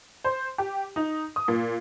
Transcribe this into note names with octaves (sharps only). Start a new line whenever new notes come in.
C5
G4
D#4
D#6
A#2